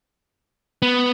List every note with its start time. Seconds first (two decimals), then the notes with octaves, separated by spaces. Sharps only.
0.82 B3